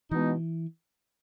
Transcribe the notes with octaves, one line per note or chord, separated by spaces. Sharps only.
B2 E3 G#3 B3 D#4